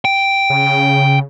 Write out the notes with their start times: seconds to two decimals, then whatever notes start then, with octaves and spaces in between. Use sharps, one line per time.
0.05 G5
0.50 C#3